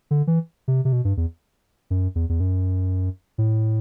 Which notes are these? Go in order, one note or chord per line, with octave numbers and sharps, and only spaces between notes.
D3
E3
C3
C3
B2
G2
E2
F#2
E2
E2
F#2
A2